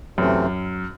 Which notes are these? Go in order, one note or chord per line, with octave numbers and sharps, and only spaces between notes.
F#2 C3 E3 A3 C4